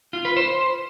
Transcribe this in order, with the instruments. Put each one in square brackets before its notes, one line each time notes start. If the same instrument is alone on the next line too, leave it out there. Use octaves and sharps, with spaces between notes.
[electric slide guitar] F4
B4
C5